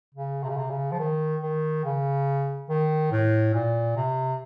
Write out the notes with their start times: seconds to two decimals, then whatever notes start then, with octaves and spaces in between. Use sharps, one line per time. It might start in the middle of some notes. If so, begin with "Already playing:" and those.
0.14 C#3
0.43 C3
0.49 C#3
0.57 C3
0.70 C#3
0.92 F3
0.99 D#3
1.42 D#3
1.85 C#3
2.69 D#3
3.11 A2
3.54 A#2
3.96 C3